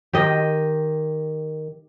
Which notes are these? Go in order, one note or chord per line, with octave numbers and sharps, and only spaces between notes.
D#3 G4 D#5